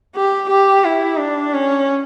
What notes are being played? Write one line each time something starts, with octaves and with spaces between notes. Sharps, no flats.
G4
G4
E4
D4
C#4